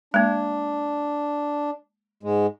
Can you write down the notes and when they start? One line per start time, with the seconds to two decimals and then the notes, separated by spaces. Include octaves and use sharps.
0.14 G#3 A#3 D4
2.23 G#2 G#3